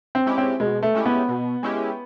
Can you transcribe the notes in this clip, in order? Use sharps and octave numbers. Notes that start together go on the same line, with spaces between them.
C4
G#3 C#4 E4 G4
C4
B2 G#3
A3
G#3 C#4 E4 G4
B3
B2
G#3 C#4 E4 G4